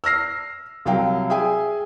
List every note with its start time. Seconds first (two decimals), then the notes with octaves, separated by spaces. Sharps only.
0.04 E6 F6 A#6 C7
0.85 C2 F#3 F5 G5
1.30 G#4 E5 G5 G#5